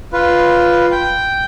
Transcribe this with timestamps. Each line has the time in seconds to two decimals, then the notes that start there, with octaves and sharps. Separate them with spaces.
0.13 F4 B4
0.91 G5